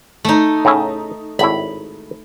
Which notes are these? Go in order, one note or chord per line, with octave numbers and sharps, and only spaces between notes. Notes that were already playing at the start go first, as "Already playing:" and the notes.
A3 D#4
A2 C#3 E4
G#1 A2 E4 B5